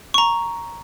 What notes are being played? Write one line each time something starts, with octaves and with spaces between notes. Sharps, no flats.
A#5 C#6